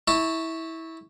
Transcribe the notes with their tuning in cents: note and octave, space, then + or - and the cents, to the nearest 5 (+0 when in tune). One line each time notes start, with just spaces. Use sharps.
E4 -20 A5 +25 C#6 +0